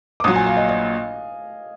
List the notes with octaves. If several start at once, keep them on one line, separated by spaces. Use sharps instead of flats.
D6
A#1 A#2 F#3 D#6
G#5
F5
D#5
D#5